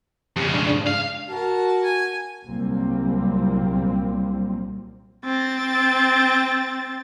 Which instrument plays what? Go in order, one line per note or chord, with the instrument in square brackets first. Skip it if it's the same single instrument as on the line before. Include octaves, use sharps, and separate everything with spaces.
[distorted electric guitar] F2 C#3 [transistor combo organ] G4
[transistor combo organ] G#2 D4
[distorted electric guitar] F5
[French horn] F#4 [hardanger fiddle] A#4 A5
[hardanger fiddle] G#5
[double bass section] C2 A#2 F#3 G3 A#3 C4
[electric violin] C4 A6